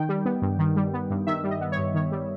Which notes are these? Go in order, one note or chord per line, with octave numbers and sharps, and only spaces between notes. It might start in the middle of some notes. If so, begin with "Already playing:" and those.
Already playing: D#3 G5
G3
B3
G2
D#3
G3
B3
G2
D#3 E5
G3
D#5
B3
C#5
G2
D#3 C#5
G3